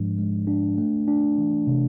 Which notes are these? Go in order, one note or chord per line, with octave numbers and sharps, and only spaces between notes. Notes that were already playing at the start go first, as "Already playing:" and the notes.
Already playing: G#2 F3 G#3 D4
G#3
D4
A3
D4
E3
C3